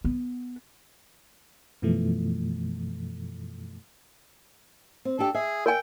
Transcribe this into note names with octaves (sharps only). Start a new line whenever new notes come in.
B3
F#2 B2 E3 F3 A3
C4
D4 G4 A4
G#4 E5
A#4 G5 G#5